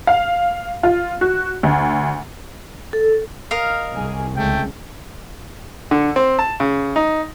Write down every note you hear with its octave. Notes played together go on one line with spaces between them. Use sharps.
F5
F4
F#4
D2
A4
A#4 D#5 F5
C2 G#4
C#2 C#3 A3 G5
D3
C4
A5
C#3
D#4